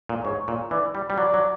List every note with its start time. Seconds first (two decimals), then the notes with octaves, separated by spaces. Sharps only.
0.09 A#2
0.24 G#2 C#5
0.48 A#2
0.71 E3 D5
0.95 G3
1.10 G3
1.18 F#3 D5
1.34 F#3